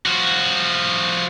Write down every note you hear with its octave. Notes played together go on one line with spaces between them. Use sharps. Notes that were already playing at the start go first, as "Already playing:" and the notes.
F3 F#4